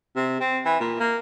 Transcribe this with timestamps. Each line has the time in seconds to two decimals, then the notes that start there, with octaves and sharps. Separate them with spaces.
0.16 C3
0.40 C4
0.65 E3
0.80 A#2
1.00 A#3